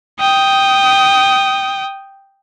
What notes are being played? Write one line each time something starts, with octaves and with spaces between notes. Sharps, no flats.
G5 D#6